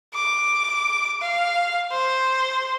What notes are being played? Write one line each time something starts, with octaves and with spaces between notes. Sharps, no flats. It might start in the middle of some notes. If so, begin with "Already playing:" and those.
D6
F5
C5